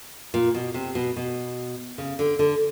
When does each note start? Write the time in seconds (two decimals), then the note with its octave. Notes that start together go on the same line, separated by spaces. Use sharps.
0.34 A#2
0.54 B2
0.74 C3
0.95 B2
1.16 B2
1.98 C#3
2.19 D3
2.39 D3